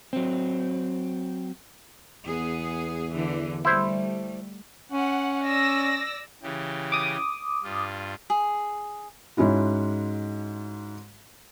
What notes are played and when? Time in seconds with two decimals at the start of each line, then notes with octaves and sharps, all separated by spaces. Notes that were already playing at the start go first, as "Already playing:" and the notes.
0.13 F#3 C4
2.27 E2 B3 G#4
3.11 D3 E3
3.65 G3 A3 E4 C5
4.92 C#4 F#5
5.46 D5 E6 A#6
6.43 C#3 E3 G4
6.92 D6 D#6
7.64 G2 F4
8.30 G#4
9.37 G#2 G#3 C#4 E4 F#4